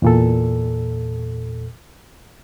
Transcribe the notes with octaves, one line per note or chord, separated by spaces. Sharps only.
E2 A#2 A4